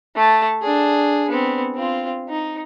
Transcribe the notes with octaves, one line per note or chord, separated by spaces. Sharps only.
A3 A5
D4 G#4
B3 C4
C4 F4
D#4